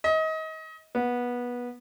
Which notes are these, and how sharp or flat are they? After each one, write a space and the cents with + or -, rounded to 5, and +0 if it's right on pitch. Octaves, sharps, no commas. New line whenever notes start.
D#5 +30
B3 -20